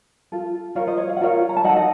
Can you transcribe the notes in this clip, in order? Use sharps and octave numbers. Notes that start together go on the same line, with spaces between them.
F4 A4
F4 A#4 C#5 F5
C5 D#5
C#5
F5
F#5
F4 A#4 C#5 F5
A#5
A5
D#4 A4 D#5 F#5
D#5 F#5